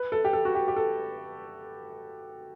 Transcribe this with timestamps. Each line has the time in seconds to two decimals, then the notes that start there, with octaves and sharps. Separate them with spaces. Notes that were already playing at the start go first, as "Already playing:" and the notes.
Already playing: B4
0.12 A4
0.25 G4
0.33 A4
0.45 F#4
0.55 G4
0.68 G4
0.77 A4